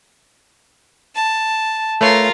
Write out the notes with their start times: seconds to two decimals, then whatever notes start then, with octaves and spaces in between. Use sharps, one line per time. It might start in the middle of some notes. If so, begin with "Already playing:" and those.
1.15 A5
2.01 A3 F4 A#4 B4 C#5